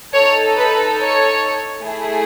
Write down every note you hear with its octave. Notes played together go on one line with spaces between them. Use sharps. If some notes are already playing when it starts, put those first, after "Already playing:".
D#4 A4 C#5
B4
C#5
A3 E4 G#4